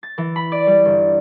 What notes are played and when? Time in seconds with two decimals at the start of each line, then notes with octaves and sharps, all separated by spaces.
0.03 A6
0.18 E3
0.36 B5
0.52 D5
0.67 G3
0.85 G1